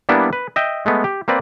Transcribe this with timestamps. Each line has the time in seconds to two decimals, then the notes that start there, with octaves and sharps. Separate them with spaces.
0.09 G3 A#3 B3 D4 E4
0.33 B4
0.56 D#5 E5 G5
0.86 G#3 A3 B3
1.04 G4
1.28 A#3 C4 B4 D5